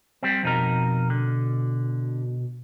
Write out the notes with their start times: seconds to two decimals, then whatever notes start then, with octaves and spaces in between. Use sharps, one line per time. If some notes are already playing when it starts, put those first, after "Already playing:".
0.23 G3 C4
0.43 F2 B2 D#4 A#4
1.10 D3